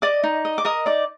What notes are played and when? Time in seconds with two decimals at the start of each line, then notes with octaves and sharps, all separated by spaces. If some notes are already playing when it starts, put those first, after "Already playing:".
0.02 D5 D#5 D6
0.24 D#4
0.45 D#5
0.58 D6
0.65 A#4 D#5 D#6
0.86 D#4 D5 D6